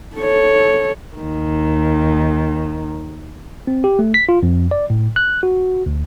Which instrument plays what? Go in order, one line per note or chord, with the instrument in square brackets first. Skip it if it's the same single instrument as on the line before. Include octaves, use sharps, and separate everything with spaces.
[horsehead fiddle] A4 C#5
[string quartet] D#2 D#3
[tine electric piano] C4
G4
A3
B6
F4
F2
D5
A2
F#6
F#4
D2